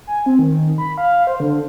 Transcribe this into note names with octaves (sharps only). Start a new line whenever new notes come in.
G#5
C4
D#3
B5
F5
C5
D3